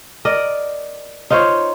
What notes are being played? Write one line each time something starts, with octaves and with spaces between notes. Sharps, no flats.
A#4 D5 D#5
D#4 F4 C5 C#5